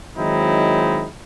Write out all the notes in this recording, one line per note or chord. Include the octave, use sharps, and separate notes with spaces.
D#3 F#3 G#3 C4 D#4 E4